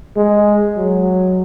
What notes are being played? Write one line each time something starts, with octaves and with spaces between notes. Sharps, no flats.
G#3
F#3